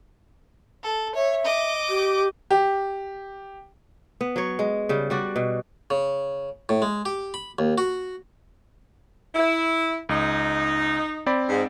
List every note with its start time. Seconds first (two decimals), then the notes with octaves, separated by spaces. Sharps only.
0.83 A4
1.15 C#5 E5
1.45 D#5 D6
1.89 G4
2.51 G4
4.21 B3
4.36 F#3 C#5
4.59 G#3
4.89 C#3 G3
5.10 G3 F#4 D5
5.36 B2
5.90 C#3
6.69 A2
6.82 G#3
7.05 G4
7.34 B5
7.59 D#2
7.78 F#4
9.35 E4
10.09 C#2 D#4
11.26 C4 D5 B5
11.49 G#2